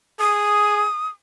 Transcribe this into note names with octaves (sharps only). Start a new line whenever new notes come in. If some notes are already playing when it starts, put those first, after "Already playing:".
G#4 D#6